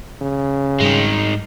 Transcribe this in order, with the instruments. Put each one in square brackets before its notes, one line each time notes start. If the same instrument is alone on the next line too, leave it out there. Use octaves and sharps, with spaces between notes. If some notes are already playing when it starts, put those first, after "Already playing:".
[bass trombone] C#3
[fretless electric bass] G#2 G3 [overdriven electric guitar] D#3 G#3